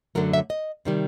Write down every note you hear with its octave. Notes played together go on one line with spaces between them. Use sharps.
F#2 D3 F#3 A3 A#4
E5
D#5
C3 D#3 G3